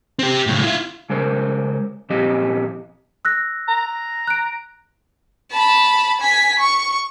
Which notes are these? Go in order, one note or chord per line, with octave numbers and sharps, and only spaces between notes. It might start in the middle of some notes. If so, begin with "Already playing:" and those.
C4 G4
C#2 A2
E4 F4
C#3 G#3 A#4 C5
A#2 F3 C4 G4 D#5
E6 F#6 A#6
A#5
F#6 D7
A5 B5
G#5 B6
C#6